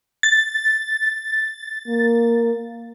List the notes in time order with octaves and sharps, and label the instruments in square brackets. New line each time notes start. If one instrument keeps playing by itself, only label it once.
[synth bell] A6
[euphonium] A#3